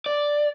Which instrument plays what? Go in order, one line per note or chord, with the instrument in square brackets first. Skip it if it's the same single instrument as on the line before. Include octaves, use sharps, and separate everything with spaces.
[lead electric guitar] D5